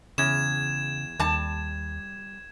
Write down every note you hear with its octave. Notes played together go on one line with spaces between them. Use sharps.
E2 C#3 G#6 E7
D#2 G3 A5